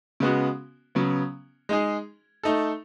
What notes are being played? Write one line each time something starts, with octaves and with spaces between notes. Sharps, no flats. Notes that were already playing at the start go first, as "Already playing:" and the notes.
C#3 G#3 B3 F#4
C#3 F#3 B3
G#3 D#4 G#4
A3 D#4 A4